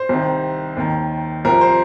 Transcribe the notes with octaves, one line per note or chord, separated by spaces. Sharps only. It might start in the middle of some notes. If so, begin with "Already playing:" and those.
Already playing: C5
C2 C3 D#3
D#2 D#3
C2 C3 F3 A#4
C5